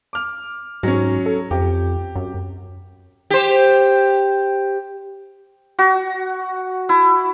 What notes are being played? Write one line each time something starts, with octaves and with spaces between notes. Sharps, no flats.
D6 F6
G#2 F#3 C#4
A4
F2 G4
F#2
G4 C5
F#4
E4